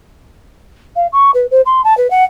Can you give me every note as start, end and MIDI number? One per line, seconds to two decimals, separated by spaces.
0.96 1.07 77
1.12 1.31 85
1.34 1.46 71
1.51 1.61 72
1.66 1.81 84
1.84 1.96 81
1.97 2.09 71
2.10 2.24 78